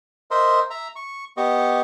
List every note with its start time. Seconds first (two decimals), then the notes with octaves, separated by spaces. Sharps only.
0.31 A#4 C5 D#5 E5 C6
0.70 E5 A#5
0.96 C#6
1.37 B3 G4 D#5 C#6